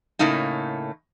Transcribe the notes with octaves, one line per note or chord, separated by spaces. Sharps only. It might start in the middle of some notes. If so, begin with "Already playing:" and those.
A2 C#3 A3 A#3 D#4